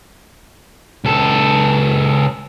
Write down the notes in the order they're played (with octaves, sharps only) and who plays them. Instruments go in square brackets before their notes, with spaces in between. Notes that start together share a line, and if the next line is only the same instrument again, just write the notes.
[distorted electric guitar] C#2 A4